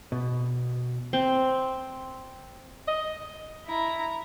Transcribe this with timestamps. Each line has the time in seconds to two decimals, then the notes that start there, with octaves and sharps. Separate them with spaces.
0.12 B2
1.13 C4
2.88 D#5
3.66 E4 A#5